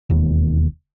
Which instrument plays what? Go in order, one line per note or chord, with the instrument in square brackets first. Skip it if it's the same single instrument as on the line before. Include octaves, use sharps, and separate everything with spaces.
[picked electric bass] E1 D#2